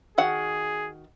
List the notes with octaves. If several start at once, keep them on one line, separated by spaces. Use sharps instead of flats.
D#3 F#4 G#4 F#5